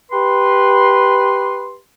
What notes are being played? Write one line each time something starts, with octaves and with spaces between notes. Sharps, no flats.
G4 B4 C6